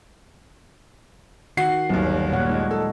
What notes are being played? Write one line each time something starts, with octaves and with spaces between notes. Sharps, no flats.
D#3 F#4 F#5 C7
G1 D#2 F#3 G3
A#2 C#5 F#5
G#3 D#4
A4